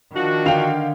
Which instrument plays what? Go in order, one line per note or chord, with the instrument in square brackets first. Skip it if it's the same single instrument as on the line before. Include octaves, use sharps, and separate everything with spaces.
[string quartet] D#3 [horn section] F3 D4 F#4
[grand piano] D3 F6 F7 [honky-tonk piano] F5 G5